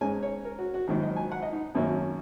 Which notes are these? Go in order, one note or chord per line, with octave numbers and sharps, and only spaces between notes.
G#2 G#3 C#4 G#5
C#5
A#4
F#4
F#4
A#1 G#2 D#3 F#3 F#4
D#5
G#5
F#5
D#5
D#4
G#1 F#2 F#3 A#3 C#4